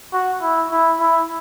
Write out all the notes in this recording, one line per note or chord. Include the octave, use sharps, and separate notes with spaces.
F#4
E4
E4
E4